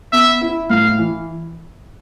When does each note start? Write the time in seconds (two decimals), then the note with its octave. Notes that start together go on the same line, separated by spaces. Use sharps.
0.13 B3 E5
0.41 E4
0.70 A2 F5
0.98 E3